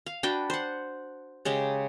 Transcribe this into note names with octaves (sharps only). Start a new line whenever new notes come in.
F5
D4 F#4 B4 G5
C5 F#5
C#3 G#3 G4